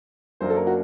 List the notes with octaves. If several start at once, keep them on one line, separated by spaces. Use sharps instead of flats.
F#1 F#2 F#3 A#3 D4 C5
A4
A#4
F#4